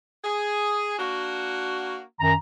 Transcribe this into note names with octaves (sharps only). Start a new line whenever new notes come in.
G#4
A#3 D4 F#4
F#2 D#3 A#5